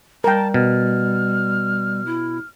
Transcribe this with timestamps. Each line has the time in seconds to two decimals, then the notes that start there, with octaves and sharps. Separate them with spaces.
0.24 G3 A#4 G5 A5
0.54 B2 F6
2.06 E4